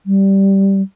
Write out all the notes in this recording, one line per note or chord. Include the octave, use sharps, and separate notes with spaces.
G3